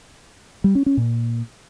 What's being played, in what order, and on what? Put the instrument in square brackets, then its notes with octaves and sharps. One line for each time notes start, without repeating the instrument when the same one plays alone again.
[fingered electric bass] G3
C#4
C#4
A#2